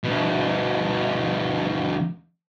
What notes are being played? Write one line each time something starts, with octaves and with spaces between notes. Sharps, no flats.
D2 B2